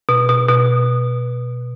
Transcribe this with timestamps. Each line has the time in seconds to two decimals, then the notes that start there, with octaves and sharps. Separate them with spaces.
0.09 B2
0.29 B2
0.49 B2